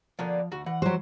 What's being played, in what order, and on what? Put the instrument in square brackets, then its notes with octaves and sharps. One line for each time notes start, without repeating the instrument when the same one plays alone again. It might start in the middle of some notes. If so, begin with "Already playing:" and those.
[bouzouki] D3 A#3 B3 [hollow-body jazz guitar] F3 F5
[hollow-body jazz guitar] D2 [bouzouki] F#4
[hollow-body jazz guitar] E3 [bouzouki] F#5
[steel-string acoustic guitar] F#3 C5 [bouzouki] F#4 G4